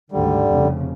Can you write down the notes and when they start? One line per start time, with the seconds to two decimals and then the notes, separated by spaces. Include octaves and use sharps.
0.12 D2 G#2 D3 D#3 G3
0.51 F1 F2 C#3